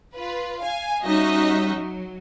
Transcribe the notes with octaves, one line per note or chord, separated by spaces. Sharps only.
F4 B4
F5 G#5
G3 C#4 D#4 F#4 D#5 E5
F#3